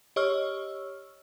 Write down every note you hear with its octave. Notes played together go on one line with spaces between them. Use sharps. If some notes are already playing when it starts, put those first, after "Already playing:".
G4 C#5 D#5 C#6 E6 F6